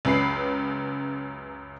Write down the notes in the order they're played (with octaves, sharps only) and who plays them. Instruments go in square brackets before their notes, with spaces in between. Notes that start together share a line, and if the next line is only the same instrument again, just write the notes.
[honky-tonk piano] C#2 F#2 B4 B5 C7